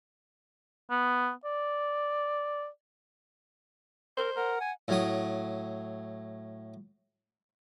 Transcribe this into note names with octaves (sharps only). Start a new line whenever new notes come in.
B3
D5
A#4 C5
A#4 F#5
G#5
A2 F#3 D#6